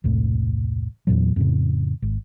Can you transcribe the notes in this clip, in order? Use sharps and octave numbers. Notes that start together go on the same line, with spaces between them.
E1 C2 A2
E2 A#2 F#3
F2 A2 C#3
G#1